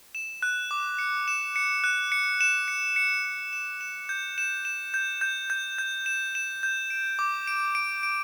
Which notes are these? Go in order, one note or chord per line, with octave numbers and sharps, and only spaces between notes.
E7
F#6
D6
C#7
E7
C#7
F#6
C#7
E7
C#7
C#7
C#7
E7
E7
G6
E7
E7
G6
G6
G6
G6
E7
E7
G6
D7
D6
D7
D7
D7